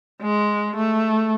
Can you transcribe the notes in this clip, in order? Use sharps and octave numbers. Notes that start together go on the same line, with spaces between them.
G#3
A3